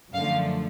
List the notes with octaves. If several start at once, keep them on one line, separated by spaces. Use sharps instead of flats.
F#2 D3 F3 A3 F5